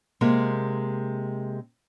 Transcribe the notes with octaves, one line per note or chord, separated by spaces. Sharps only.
C3 G#3 A#3